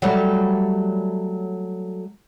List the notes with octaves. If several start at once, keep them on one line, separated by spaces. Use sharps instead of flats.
F#3 G3 A3